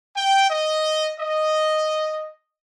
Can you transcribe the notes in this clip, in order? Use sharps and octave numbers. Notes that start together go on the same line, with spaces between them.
G5
D#5
D#5